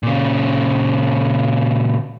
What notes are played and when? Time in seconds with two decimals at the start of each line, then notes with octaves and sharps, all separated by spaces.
0.03 A#2 C#3